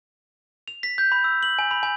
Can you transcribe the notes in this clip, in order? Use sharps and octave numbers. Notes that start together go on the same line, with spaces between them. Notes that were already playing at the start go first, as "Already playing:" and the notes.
F7
B6
G6
B5
E6
F#7
G#5
B5
G#5